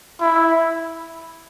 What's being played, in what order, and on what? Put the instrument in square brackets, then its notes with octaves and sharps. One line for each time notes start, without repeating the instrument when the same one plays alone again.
[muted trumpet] E4